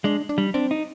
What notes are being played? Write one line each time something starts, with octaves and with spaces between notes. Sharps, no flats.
G#3 D4
D4
G3
C4 D4
D#4